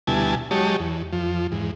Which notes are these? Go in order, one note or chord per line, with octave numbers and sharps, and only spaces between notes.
D2 B2 G3 E4 G#5 A5
F#3 G#3 G4 C#5 D#5 A5
E2
F2 F3
E2 G#2